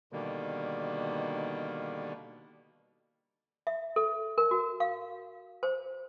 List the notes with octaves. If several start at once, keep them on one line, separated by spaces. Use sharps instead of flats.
B2 D3 D#3 G3 A#3
E5
A4
A#4
F#4
F5
C5